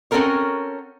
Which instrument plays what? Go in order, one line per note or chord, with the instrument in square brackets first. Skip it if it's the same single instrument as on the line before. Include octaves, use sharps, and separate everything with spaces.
[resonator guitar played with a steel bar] C4 C#4 F#4 A4 A#4 C#5